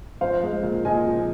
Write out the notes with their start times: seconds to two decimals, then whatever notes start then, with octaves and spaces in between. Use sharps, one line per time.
0.21 F3 C5 F5
0.43 G#3
0.63 A#2
0.85 A#2 D#5 G#5
1.06 F3